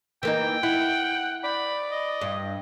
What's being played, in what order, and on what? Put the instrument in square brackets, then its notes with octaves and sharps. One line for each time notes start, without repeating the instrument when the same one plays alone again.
[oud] E3 A#3 D#4 [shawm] G5
[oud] E4 [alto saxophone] F#5
[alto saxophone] D5 [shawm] B5
[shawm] D#5
[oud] G2